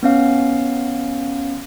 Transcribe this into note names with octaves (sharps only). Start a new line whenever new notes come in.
B3 C#4 F5